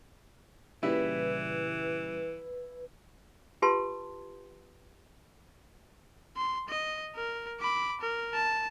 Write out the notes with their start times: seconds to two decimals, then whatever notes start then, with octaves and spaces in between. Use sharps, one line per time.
0.83 A#2 C#3 E3 G3 E4 B4
3.62 F4 G4 B4 A5 C6
6.37 C6
6.69 D#5
7.16 A#4
7.60 B5 D6
8.01 A#4
8.34 A5